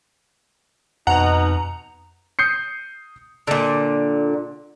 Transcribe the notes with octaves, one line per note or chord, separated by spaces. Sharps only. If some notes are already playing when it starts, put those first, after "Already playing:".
F2 B2 D#4 F#5 A#5
D#6 G6 C7 C#7
A#2 D3